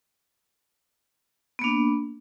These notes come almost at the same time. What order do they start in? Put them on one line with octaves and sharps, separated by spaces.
B3 A#3 D4